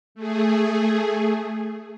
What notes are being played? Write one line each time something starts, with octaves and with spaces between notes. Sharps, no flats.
A3 G#4